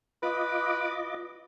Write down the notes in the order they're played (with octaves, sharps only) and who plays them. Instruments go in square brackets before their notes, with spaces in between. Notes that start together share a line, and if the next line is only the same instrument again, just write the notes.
[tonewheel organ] F4 D#5 D6 [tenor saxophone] B4